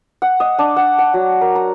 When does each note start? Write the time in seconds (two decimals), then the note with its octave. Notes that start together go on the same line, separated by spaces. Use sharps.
0.22 F#5
0.40 D#5
0.59 D4
0.76 F#5
0.98 F#5
1.14 F#3
1.41 A#4
1.55 A#5